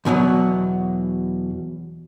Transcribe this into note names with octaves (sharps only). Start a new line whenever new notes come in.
E2 B2 E3 F#3